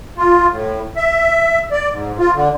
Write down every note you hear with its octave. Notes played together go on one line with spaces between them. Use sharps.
F4
A2
E5
D5
G#2
F4
D3